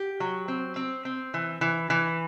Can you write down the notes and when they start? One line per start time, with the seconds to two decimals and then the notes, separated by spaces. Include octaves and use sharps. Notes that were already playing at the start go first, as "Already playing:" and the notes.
Already playing: G4
0.20 F#3
0.48 C4
0.76 C4
1.05 C4
1.34 E3
1.61 E3
1.90 E3